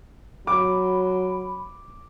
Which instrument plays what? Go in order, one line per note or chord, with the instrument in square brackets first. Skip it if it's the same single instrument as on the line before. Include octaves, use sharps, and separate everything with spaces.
[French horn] F#3 [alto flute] B5 [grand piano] D6